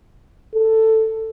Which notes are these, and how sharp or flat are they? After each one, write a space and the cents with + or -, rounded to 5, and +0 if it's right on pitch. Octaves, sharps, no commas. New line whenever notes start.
A4 +10